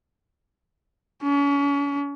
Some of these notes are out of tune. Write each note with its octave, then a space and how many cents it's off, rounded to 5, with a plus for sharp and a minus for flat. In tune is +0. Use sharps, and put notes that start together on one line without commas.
C#4 +40